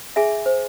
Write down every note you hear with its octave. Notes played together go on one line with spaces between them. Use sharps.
G#4 E5 G#5
C5